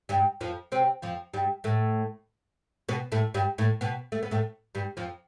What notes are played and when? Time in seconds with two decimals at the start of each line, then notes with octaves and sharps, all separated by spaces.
0.09 G2 G3
0.41 F2 F3
0.72 C3 C4
1.02 F2 F3
1.34 G2 G3
1.64 A2 A3
2.89 B2 B3
3.12 A2 A3
3.34 G2 G3
3.58 A2 A3
3.81 B2 B3
4.12 A3
4.23 B3
4.31 A2 A3
4.75 G2 G3
4.97 F2 F3